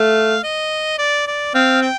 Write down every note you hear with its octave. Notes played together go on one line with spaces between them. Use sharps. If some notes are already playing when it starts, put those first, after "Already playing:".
Already playing: A3 F5
D#5
D5
D5
C4 F5
G5